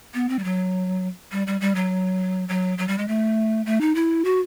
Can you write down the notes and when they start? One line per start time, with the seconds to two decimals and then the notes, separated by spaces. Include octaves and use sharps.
0.14 B3
0.29 C4
0.39 G3
0.44 F#3
1.32 G3
1.47 G3
1.61 G3
1.75 F#3
2.49 F#3
2.78 F#3
2.88 G3
2.98 G#3
3.08 A3
3.66 A3
3.81 D#4
3.95 E4
4.25 F#4